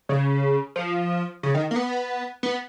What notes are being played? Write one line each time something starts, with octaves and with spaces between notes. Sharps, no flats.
C#3
F3
C#3
D#3
A#3
B3
B3